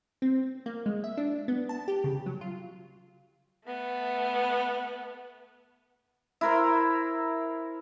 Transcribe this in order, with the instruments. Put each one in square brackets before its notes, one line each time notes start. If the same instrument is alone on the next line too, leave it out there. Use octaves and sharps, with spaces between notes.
[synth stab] C4
A#3
G#3
E5
D4
B3
A5
G4
C#3
F#3
F4
[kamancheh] A3 B3
[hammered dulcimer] E4 A#4 C5